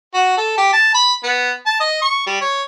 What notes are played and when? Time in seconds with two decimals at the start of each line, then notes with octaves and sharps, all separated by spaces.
0.14 F#4
0.37 A4
0.58 G4
0.73 A5
0.94 B5
1.23 B3
1.66 A5
1.80 D#5
2.02 C#6
2.27 G3
2.41 C#5